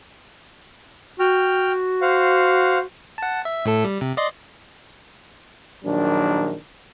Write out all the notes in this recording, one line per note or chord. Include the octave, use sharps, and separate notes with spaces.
F#4 G5 F6
C5 F5 F#5
F#5 A5
E5
A2 A3 A4
G3
C3
D5 D#5 C6
A#1 D#3 F#3 D4